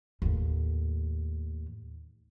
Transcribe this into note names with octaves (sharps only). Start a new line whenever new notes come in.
D#2 A2